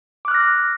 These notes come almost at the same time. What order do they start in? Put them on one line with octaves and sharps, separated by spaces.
D6 F#6 F6 A#6